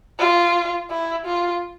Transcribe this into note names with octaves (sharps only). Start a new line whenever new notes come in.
F4
E4
F4